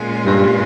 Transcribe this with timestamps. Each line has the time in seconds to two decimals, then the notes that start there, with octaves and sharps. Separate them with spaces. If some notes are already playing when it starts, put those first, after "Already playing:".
Already playing: A#2 G#3 C#4 F4
0.26 G2